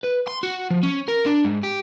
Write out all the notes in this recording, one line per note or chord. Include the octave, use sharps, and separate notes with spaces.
B4
C6
F#4
F3
C#4
A#4
D4
G#2
G4